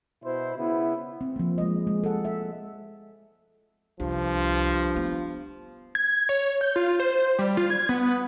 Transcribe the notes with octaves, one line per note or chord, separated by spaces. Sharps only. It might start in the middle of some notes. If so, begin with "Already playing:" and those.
B2 E4 C5
C#3 B3 E4
C4
F3 A#3
G#3 D#5
G#3
A4 F#5
E5
C2 G2 F3
B3
G#6
C#5
G6
F4
C5
G3
F4
G#6
B3